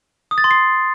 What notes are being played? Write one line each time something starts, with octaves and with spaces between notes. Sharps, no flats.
D#6
A6
C6
C7